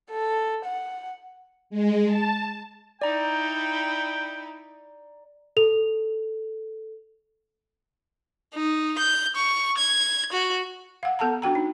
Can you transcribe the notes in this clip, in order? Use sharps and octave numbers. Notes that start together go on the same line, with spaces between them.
A4
F#5
G#3
A5
D#4 E4 D5 G5 A#5
A4 F7
D#4
G6
C#6
G#6
F#4
F5 F#5
B3 A4 F#5 A5 A#5
D4 F#4 G5 A#5
D#4